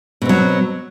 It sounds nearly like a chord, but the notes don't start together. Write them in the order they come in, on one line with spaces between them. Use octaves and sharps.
B2 C4 F#3